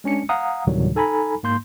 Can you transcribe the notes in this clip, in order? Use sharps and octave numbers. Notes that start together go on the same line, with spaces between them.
G#3 C#4 D4 C#7
F5 F#5 A#5 D#6
D2 A2 C3 D#3 F#3 G3
D#4 A4 G#5 A#5 B5
G#2 A#3 C6 G6